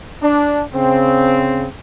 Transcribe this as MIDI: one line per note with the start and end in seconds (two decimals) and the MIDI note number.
0.22 0.62 62
0.74 1.66 49
0.74 1.66 60